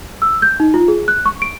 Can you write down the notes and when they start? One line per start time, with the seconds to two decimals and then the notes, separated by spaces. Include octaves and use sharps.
0.22 E6
0.42 G6
0.60 D#4
0.74 F4
0.88 G#4
1.08 F#6
1.26 C#6
1.42 D7